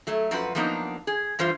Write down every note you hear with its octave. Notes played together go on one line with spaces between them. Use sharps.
F#3 A3
F#2 F3 F#4 B4 F#5
F3 F#3 A#3 B3 D4 D#4
G#4
G2 E3 F4 C5